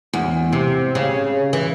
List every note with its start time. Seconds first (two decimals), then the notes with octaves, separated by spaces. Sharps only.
0.13 E2
0.52 C3
0.95 C#3
1.53 E3